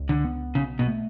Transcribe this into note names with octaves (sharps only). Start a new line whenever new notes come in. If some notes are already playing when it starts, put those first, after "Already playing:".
Already playing: C#2
D3
B3
B1 C#3
B2
A3